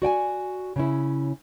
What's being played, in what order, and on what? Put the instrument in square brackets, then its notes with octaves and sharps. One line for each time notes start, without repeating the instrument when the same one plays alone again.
[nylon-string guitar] F#4 D5 G5 G#5
C#3 C#4 E4